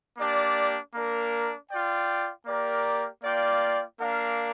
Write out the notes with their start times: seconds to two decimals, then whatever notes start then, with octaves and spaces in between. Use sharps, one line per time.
0.16 A#3 D4 G4 D5
0.93 A#3 D4 A#4
1.70 F4 D5 G5
2.46 A#3 G4 A#4 D5
3.22 A#3 F4 D5 G5
3.98 A#3 D4 A#4 F5